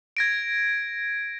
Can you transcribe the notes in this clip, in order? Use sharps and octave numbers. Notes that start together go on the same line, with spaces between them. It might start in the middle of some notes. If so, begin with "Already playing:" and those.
G#6 A#6 D7